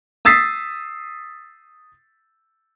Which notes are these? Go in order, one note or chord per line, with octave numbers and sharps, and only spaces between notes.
D#6 E6 A6 B6 C7